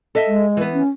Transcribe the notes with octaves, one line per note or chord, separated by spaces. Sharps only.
A4 D#5 E5
G#3
E3 B3
C#4